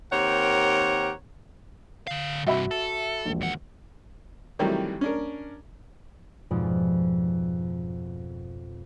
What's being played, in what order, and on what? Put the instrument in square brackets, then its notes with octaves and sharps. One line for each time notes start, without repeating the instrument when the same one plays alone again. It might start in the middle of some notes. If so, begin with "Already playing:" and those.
[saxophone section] D#2 C4 G4 A#4 C#5 F#5
[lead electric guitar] D3 F5
[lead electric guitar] G2 C3 [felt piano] F#4 E5 B5
[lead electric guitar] A4
[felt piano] E1 A#1
[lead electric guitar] D#2 F#5
[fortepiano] C3 D#3 E3 F#3 G3 A3
C#4 D4 A#4
[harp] F2 G#2 B2 F3 G#3 D5